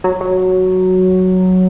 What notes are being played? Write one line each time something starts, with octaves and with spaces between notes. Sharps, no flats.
F#3
F#3